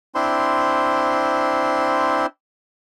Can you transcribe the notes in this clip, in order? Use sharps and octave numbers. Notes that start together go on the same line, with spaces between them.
C4 D4 E4 C5 C6